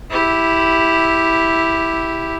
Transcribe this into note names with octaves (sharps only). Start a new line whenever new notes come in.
E4 G4